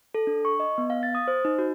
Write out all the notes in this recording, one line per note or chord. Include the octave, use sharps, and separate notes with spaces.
A4
D4
C#6
D#5
B3
F5
A6
D#6
C5
D#4
F#4